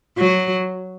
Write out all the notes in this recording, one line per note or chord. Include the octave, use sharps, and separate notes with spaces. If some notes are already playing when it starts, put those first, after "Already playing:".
F#3